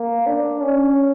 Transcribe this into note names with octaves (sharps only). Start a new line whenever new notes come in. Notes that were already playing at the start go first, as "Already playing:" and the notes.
Already playing: A#3
D4
C#4